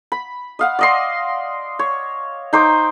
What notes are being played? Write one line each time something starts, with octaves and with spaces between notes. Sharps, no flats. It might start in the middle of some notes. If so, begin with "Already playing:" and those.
B5
D#5 F5 F#5
D5 D#5 C6
C#5
D#4 C5 A#5 D6